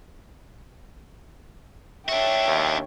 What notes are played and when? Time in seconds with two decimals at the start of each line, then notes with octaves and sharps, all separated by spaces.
2.09 D4 F#4 C#5 E5 G5
2.47 D#2